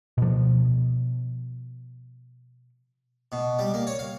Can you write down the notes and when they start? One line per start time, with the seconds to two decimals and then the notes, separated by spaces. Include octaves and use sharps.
0.18 B2 F3
3.32 B2
3.59 G3
3.74 A#3
3.87 C#5
3.99 F5